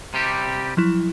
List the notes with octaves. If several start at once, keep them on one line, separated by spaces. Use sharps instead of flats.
C3 G3 G4
F3 F#3 E4